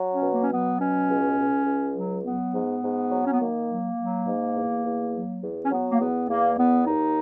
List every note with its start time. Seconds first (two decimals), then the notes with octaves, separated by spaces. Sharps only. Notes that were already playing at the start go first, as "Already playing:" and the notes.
Already playing: F#3
0.12 C#4
0.21 B2
0.31 A#3
0.42 C#4
0.50 F#3 B3
0.79 B2 C#4
1.08 C#2
1.36 C#2
1.66 C#2
1.95 F#3
2.23 F#3 B3
2.53 G#2
2.82 G#2
3.10 F#3
3.25 C#4
3.32 B3
3.39 D#3 A#3
3.68 F#3
3.97 F#3
4.26 G#2
4.55 E2
4.84 E2
5.13 F#3
5.42 E2
5.65 C#4
5.70 F#3 B3
5.91 A#3
5.99 E2 B3
6.29 E2 A#3
6.57 E2 B3
6.86 D#2 D#4